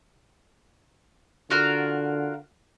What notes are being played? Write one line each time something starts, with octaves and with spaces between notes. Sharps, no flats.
D3 F4 F#4 A#4